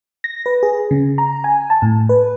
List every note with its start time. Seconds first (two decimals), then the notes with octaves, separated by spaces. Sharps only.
0.24 A#6
0.46 B4
0.63 G#4
0.91 C#3
1.18 A#5
1.44 G#5
1.70 A5
1.82 A2
2.09 B4